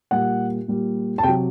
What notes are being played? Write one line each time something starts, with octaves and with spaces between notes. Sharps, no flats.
A#2 G3 F#5
A#2 G3
A5
C3 F#3 G5